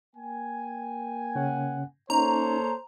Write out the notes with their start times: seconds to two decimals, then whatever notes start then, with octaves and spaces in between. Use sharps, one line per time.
0.16 A#3 G5 G#5
1.35 C#3 C#4 F#5
2.10 A#3 C#4 D#4 A4 C5 C#5 A#5